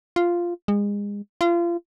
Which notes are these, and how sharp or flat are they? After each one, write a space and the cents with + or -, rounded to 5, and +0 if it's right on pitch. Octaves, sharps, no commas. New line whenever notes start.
F4 -5
G#3 -30
F4 -30